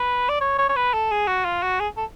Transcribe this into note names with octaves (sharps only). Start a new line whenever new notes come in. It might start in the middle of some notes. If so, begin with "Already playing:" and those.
Already playing: B4
D5
C#5
C#5
C#5
B4
A4
G#4
F#4
F4
F#4
G#4
A4